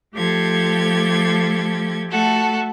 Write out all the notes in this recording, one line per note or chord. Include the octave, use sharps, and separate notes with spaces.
F3 A3 G4 A4 G#6
A3 F#4 A4